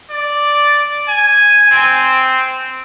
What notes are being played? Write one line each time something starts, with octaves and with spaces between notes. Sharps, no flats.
D5
G#5
C4